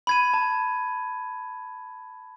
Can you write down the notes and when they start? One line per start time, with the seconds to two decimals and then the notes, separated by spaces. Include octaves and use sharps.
0.07 B5 G#6 D#7
0.34 A5